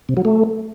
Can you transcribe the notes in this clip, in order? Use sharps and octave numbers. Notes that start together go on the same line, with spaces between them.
C3
F#3
A3